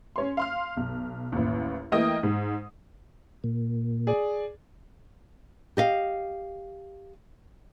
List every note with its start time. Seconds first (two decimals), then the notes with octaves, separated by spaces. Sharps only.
0.16 C#4 C#5 C6
0.37 F5 C6 F6
0.77 B1
1.32 A1 D#2
1.92 E3 A3 A#3 D#5 G5 D#6
2.23 G#2
3.44 A#2
4.07 G#4 D5
5.77 G4 D#5 F5